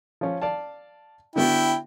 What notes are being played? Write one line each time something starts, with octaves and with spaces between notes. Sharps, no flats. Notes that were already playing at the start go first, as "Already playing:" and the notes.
F3 C#4
D5 F5 A5
D3 B3 E4 F#4 G5